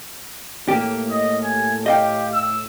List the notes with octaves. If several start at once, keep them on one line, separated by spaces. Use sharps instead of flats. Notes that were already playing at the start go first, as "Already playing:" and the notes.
A2 A#3 G4
D#5
G#5
G4 D#5 F5 G5
E6